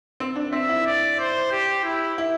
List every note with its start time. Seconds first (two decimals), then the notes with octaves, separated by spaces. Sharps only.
0.20 C4
0.36 D4
0.52 C4 E5
0.69 E4
0.86 D5
1.19 C5
1.51 G4
1.84 E4
2.18 E4